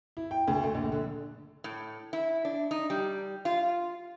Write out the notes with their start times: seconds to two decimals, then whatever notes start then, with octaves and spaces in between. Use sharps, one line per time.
0.17 E4
0.31 G5
0.48 D2
0.63 A3
0.75 A#1
0.92 D3
1.64 A2
2.13 E4
2.45 D4
2.71 D#4
2.90 G3
3.45 F4